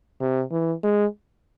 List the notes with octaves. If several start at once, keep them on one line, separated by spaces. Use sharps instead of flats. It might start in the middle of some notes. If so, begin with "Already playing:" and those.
C3
E3
G#3